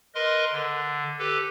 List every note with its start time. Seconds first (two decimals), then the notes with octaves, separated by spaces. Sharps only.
0.15 A#4 B4 D#5 C6
0.52 D3
1.19 G4 A4 B4